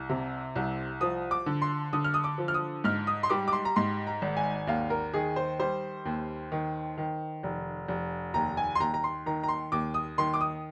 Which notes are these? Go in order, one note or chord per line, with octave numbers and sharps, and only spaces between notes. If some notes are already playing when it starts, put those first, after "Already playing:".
Already playing: C2
C3
C2
F3 D#6
D6
D3
C6
D3 D#6
F6
D#6
D6
F3
F6
D#6
G#2 F6
D#6
C6
G3 D6
D6
C6
A#5
G#2 C6
A#5
G#1
G#5
D#2 F5
A#4
D#3 G#4
C5
G3 C5
D#2
D#3
D#3
F1
F1
D#2 A#5
G#5
C6
D#2 A#5
A#5
C6
D#3 A#5
A#5
C6
D#2 D6
D#6
D#3 C6
D6
D#6